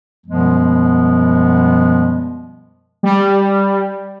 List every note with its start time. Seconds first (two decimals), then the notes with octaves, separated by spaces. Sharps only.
0.27 F#2 B2 F3 G3 G#3 B3
3.03 G3